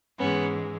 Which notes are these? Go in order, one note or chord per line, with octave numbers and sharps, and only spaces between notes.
G#2 E3 G#3 B3 C#4